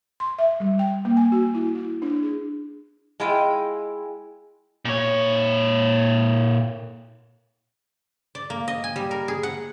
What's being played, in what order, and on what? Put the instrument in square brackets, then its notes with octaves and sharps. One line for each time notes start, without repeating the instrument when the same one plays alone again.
[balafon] C6
E5
G3
G5
A#3
G#5
F#4
E4
E4
D4
G#4
[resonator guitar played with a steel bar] G#3 E4 F4 G5
[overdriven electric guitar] A#2 C#5
[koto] D5
A#3
D#5
G#5
G3
A#4
G#4
F#5